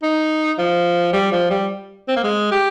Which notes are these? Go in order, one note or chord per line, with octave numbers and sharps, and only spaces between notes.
D#4
F3
G3
F3
G3
C4
A#3
G#3
G4